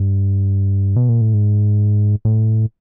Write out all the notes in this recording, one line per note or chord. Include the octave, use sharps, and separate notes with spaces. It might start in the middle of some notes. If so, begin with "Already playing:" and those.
Already playing: G2
B2
A#2
A2
G#2
A2